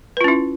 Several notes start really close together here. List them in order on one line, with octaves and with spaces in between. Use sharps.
B4 F4 C#4 E4